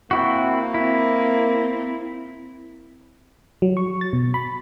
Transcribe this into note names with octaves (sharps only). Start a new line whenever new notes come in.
A#3 C4 E4 F#4
C4 E4
F#3
C#6
A6
B2
B5